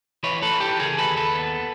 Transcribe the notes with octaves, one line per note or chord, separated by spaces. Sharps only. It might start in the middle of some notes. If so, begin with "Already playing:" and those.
E3 B4 C#5
A4 B4
E3
G4 A4
C#3 G#4 A#4
A4 B4
D#2
A4 B4
B3